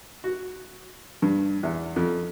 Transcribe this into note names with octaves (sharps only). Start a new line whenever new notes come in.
F#4
G2
E2
F2